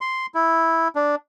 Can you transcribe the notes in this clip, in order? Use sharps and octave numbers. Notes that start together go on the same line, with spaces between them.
C6
E4
D4